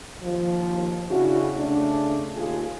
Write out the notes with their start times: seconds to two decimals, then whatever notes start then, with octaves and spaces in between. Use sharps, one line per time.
0.23 D#2 F3
1.10 C#3 D4 E4 F#4
1.57 C#3 A3 D4
2.36 D#2 F4 G#4